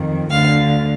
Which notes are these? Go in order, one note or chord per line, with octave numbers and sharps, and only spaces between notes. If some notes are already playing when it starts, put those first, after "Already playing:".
Already playing: F2 D#3
D2 D3 F5